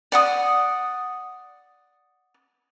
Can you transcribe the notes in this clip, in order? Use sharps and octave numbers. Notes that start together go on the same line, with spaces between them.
D5 F#5 D#6